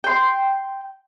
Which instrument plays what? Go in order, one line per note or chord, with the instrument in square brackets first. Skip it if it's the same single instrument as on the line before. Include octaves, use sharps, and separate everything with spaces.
[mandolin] G5 C6